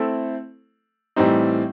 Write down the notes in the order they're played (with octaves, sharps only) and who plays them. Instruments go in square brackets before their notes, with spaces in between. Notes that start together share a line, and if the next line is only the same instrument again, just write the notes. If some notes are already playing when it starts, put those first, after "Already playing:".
Already playing: [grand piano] A3 C4 E4 A4
A2 E3 G3 C4 D#4